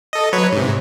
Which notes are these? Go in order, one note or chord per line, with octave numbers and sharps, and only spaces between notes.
A4 D#5
F#3 B4 C#5
G#2 C3